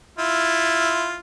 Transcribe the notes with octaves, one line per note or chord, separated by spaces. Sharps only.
E4 F4